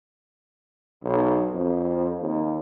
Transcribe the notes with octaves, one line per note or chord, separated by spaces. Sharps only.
B1
F2
D#2